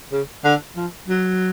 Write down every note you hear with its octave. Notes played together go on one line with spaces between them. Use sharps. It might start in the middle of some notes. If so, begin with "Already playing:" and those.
C#3
D3
F3
F#3